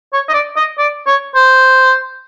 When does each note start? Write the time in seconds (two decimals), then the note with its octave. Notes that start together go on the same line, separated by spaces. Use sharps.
0.13 C#5
0.29 D#5
0.34 D5
0.56 D#5
0.78 D5
1.07 C#5
1.35 C5